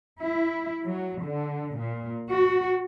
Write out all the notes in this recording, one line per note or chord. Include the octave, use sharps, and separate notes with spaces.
E4
F#3
D3
A#2
F#4